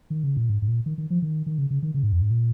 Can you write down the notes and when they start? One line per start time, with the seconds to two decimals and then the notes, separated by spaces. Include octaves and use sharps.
0.10 D#3
0.24 C#3
0.37 A#2
0.50 G#2
0.62 G#2
0.68 A#2
0.86 D#3
0.98 D#3
1.10 F3
1.22 D#3
1.46 D#3
1.58 C#3
1.71 C#3
1.83 D#3
1.94 C#3
2.03 G#2
2.12 F2
2.21 G#2
2.31 A#2